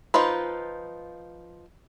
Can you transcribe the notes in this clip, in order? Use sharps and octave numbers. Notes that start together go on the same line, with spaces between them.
F3 D#4 F4 B4